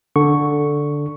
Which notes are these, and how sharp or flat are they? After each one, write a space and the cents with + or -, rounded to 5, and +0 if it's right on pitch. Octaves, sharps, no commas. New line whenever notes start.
D3 +0 C#6 +0